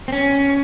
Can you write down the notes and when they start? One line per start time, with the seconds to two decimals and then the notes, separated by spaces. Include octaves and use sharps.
0.08 C4
0.12 C#4